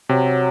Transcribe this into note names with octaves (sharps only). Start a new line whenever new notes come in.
C3 F#3